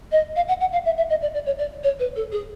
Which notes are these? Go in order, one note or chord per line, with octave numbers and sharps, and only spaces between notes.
D#5
F5
F#5
F#5
F5
E5
E5
D#5
D5
D5
C#5
D5
C#5
B4
A4
G#4